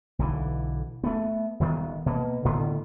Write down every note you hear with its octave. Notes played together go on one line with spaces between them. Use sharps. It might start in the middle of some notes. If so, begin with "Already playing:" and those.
B1 D3 E3
A3 B3
D#1 D#3 B3
B2 A#3
A2 D3 D#3 B3